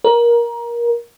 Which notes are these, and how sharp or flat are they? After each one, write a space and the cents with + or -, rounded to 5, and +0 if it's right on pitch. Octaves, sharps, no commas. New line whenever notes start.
A#4 +20